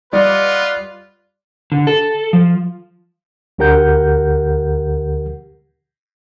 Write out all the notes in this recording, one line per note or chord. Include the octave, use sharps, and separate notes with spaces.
G3 F4 B4 D5 D#5 F#5
D3
A4
F3
D2 D3 G4 A#4 F#5 G6